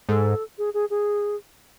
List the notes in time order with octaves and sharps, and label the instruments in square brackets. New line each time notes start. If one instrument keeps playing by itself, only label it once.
[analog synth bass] G#2 [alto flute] A4
[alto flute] G#4
G#4
G#4